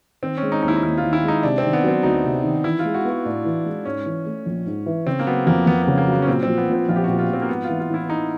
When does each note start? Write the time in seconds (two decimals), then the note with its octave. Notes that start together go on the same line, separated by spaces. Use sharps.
0.22 D#3 C4
0.37 G#3 C#4
0.52 D#4
0.62 D#2 D#4
0.68 E4
0.77 D#4
0.83 D#2 E4
0.98 F4
1.03 D#3
1.13 E4
1.23 G#3
1.28 D#4
1.43 C3 D4
1.58 C4
1.64 D#3
1.73 B3
1.84 F#3 C4
2.03 D2 D#4
2.24 C3
2.44 D#3
2.64 E3 E4
2.79 F4
2.85 G#3
2.94 F#4
3.05 B3 F#4
3.25 A2 D4
3.45 E3
3.65 G#3
3.85 G#2 C#4
4.06 E3
4.26 A3
4.46 A#1
4.66 G#2
4.86 E3
5.06 C#3 C4
5.19 A#3
5.27 F#3 B3
5.47 F2 A#3
5.67 F2 B3
5.83 C#3 B3
5.98 A#3
6.08 F#3 B3
6.22 C#4
6.27 A#2 C4
6.43 F3 C4
6.57 B3
6.68 A#1
6.73 C4
6.89 A#1 F4
6.96 G4
7.04 A#2 F#4
7.19 F4
7.29 F3 C4
7.42 A#3
7.49 G#2 B3
7.64 E3 F4
7.80 F4
7.89 A1 E4
8.09 A1 D#4